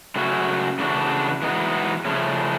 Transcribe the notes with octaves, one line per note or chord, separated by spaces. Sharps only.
C#3 F#3 A3 C#4 F#4
C#3 E3 A3 D4 F#4
E3 G#3 B3 D#4 F#4
C#3 F3 A3 C#4